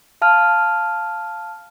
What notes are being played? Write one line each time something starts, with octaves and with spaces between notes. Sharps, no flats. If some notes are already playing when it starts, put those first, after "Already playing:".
F5 A5 F6